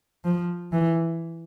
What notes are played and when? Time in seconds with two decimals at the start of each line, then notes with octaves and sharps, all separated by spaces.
0.25 F3
0.72 E3